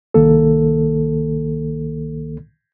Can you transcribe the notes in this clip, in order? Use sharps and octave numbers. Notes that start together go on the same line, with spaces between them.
C2 D#3 A#3 A4